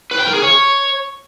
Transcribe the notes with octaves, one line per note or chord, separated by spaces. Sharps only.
B4
G5
A#4
G#4
C#5